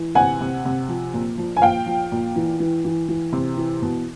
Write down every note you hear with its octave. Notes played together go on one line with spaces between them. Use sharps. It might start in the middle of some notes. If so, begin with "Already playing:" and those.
Already playing: E3
C3 F#5 G#5
C3
C3
F3
A#2
F3
G#5
A#2 F5 G5
F3
A#2
E3
E3
E3
E3
C3
E3
B2